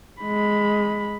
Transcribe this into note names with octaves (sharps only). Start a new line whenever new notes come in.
G#3 B5